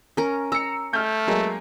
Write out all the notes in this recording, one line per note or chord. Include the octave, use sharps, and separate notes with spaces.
C#4 A#4
A#5 E6 C#7
A3 F6 G6
F#3 G#3 A#3